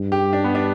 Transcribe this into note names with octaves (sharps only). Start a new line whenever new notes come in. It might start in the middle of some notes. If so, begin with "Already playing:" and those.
Already playing: G2
G4
D4
B3
D4